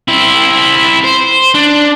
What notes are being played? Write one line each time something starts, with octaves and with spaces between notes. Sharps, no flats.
C4 E4
C5
D4